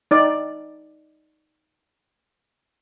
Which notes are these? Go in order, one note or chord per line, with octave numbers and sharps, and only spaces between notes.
D#4 D5